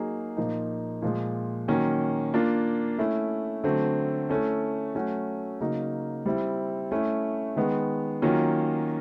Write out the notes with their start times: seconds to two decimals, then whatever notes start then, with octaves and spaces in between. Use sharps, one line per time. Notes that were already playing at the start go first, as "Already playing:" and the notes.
Already playing: F#3 A#3 D#4 G#4
0.37 A#2 F3 A#3 D#4
1.02 A#2 F3 G#3
1.68 D#3 F#3 A#3 C#4
2.34 A#3 D4 F4
2.98 A3 C#4 E4
3.64 D3 F#3 A3 C4
4.29 A3 C#4 E4 A4
4.95 F#3 A3 C#4 F#4
5.61 C#3 F#3 A#3 D#4
6.26 G3 C4 E4
6.91 A3 C#4 E4
7.56 D#3 G#3 B3
8.22 D#3 F#3 A#3 C#4 F4